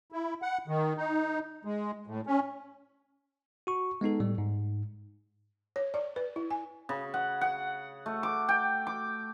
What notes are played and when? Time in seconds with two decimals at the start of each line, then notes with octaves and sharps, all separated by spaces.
0.12 E4
0.42 F#5
0.68 D#3
0.97 D#4
1.65 G#3
2.07 A2
2.27 C#4
3.67 F#4 C#6
4.01 G#3 B3 D#4 A4
4.20 A2 G3
4.38 G#2
5.76 C#5
5.94 D5
6.16 B4
6.36 E4
6.51 G#5
6.89 C#3
7.14 F#5
7.41 F#5
8.06 A3
8.23 D6
8.49 G5
8.87 D6